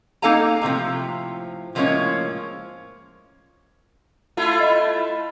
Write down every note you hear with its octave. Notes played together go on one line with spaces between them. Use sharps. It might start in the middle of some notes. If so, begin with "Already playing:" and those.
A#3 D#4 A4 F5 G#5 A#5
A2 C3 D#3 F3
A2 F3 G#3 A#3 C#4 C#5
A3 E4 F4
D#5 B5